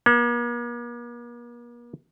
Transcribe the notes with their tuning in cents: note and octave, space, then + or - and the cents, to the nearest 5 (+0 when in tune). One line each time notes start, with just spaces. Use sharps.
A#3 +45